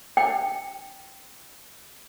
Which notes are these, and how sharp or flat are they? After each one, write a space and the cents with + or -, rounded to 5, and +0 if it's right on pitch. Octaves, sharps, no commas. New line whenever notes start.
G5 -5